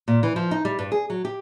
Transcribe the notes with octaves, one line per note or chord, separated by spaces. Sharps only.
A#2
E3
F3
D#4
G3
G2
G#4
F#3
G4